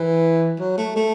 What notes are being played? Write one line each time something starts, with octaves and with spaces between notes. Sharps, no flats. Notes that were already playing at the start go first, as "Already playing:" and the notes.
Already playing: E3
F#3
A3
A3